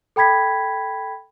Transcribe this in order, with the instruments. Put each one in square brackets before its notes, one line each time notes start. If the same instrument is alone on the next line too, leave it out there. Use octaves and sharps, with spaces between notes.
[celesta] A4 G5 B5 G#6 B6